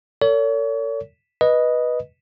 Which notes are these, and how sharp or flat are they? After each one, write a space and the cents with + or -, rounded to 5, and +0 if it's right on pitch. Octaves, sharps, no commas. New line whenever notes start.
A4 +45 C#5 +40
B4 -10 D#5 +0